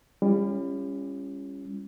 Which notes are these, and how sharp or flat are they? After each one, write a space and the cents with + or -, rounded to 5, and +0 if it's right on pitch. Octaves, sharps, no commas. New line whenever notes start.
G3 +35 C#4 +0 F4 -40